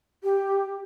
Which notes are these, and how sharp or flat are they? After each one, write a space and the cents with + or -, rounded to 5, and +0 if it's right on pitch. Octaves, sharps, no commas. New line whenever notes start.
G4 +5